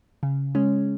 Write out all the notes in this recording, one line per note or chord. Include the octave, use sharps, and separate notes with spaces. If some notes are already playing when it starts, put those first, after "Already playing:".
C#3
G#3 C#4